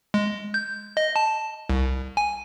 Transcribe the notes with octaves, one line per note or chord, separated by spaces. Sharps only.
G#3
G6
D#5
A5
C2
G#5